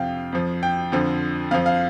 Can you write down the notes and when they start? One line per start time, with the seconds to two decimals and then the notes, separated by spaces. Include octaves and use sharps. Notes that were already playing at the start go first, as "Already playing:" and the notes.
Already playing: F2 C3 F3 F5 G5
0.32 F2 F3
0.63 G5
0.92 F2 D3 F3
1.51 F2 F3 F5
1.66 F5